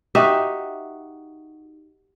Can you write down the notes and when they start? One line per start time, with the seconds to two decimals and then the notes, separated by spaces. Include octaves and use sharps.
0.15 D#4 F#4 G4 E5